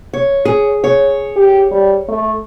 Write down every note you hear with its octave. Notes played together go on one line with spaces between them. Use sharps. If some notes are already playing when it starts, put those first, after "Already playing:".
C#5
G#4
C#5
G4
G3
A3